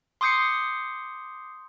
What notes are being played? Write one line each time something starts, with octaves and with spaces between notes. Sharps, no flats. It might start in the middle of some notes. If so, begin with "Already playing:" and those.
C6 D6 D#6 G6 C7 C#7